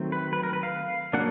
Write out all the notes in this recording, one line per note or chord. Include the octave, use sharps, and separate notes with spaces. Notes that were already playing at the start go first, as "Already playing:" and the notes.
Already playing: D#3 F#3 A3 C4
B4
B4
A#4
B4
F5
F#3 A#3 D4 F#5